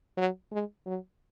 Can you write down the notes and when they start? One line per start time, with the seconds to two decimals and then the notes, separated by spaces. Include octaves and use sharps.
0.17 F#3
0.52 G#3
0.86 F#3